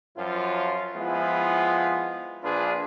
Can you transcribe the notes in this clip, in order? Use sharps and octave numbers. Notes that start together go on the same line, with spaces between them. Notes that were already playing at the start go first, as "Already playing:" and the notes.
F#2 F3 F#3 F4
F3 G#3 B3 E4 F4
A#1 D4 F4 G#4 B4